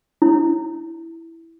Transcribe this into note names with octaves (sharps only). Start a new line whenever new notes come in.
E4